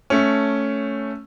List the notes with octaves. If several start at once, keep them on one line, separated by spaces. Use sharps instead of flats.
A3 C#4